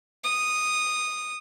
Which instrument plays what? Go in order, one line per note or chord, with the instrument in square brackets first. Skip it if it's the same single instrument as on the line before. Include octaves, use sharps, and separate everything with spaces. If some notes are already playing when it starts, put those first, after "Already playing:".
[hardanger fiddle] D#6